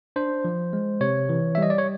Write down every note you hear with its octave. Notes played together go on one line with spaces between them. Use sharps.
D4 C5
F3
G#3
C3 C#5
E3
E5
G3 D#5
D5
C#5